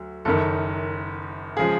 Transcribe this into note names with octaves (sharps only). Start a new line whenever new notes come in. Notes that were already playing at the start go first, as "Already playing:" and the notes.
Already playing: D2 F#3
F#1 F#2 D#3 A4
C#3 F3 G#3 G#4